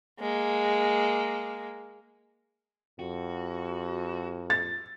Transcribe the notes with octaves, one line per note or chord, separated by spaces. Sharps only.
G#3 A#3
F2 F#4
A6